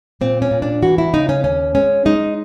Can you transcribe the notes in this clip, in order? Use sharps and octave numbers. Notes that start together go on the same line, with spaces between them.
A#2 C4
C#4
A#2
D4
E3 F#4
E4
C#3 D#4
C#4
D#2 C#4
G#3 C#4
G#3 D#4